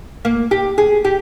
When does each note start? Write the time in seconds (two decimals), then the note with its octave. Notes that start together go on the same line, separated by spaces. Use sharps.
0.25 A#3
0.51 G4
0.78 G#4
1.05 G4